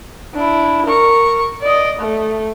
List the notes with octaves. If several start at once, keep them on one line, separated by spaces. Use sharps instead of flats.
D4 E4
A#4 C#6
D5 D#5
A3